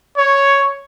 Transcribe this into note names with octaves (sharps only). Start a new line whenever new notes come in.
C#5